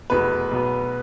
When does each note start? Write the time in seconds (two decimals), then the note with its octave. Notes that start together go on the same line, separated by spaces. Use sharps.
0.10 F1 E2 B2 B3 B4
0.51 B1 B2 B3